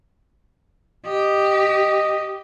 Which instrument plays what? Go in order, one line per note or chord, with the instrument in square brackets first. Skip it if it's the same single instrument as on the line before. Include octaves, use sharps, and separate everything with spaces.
[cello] G4 [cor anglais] D#5